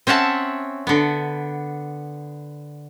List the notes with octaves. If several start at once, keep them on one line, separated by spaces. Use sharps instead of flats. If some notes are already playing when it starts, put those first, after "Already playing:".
C4 C#4 E5 F#5 A5
D3 B3